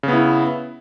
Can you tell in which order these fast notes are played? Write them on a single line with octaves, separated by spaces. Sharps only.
C#3 B3 E4